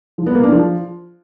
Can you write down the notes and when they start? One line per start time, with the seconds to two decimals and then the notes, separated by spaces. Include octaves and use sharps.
0.18 F3
0.26 B3
0.35 A#3
0.43 D4
0.52 F3